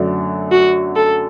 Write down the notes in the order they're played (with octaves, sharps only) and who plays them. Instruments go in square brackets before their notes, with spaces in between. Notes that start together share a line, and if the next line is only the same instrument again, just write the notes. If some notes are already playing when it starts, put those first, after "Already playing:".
Already playing: [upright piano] F#2 D3 F#3 A3 D4
[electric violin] F#4
A4